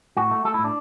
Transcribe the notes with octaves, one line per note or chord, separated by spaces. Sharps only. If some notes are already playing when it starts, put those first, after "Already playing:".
A2 F#4
A3
A3 A4
E4
A2
D4